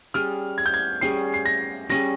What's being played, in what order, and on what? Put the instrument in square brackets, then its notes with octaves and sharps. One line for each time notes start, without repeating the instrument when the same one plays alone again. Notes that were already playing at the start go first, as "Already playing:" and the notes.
[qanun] G3 C#4 G#4 [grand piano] F6
[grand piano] G#6
G6
G#6
[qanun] G3 C#4 G#4 [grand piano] C7
[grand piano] C7
A#6
[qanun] G3 C#4 G#4 [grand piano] A#6